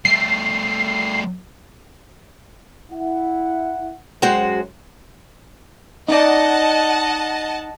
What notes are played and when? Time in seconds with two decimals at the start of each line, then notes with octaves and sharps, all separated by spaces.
0.05 G3 A3 C7
2.92 E4 F#5
4.22 F#2 G#3 F#4 C5
6.08 D#4 D5 D#5 F#5 A5